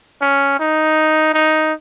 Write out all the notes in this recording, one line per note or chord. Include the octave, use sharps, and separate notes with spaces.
C#4
D#4
D#4